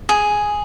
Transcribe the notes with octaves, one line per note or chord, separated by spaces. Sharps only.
G#4